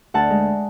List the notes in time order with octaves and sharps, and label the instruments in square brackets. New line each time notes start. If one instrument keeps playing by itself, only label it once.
[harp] D2 F#5 A5
G#3